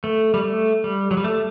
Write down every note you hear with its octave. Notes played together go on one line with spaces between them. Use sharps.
A3
G3
A3
G3
F#3
G3
A3